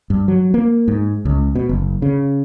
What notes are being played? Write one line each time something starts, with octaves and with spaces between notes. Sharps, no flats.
G2
F#3
A#3
G#2
C#2
B2
F#1
C#3